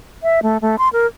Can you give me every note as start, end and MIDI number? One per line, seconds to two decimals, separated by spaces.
0.23 0.40 76
0.43 0.58 57
0.62 0.76 57
0.78 0.89 84
0.93 1.06 70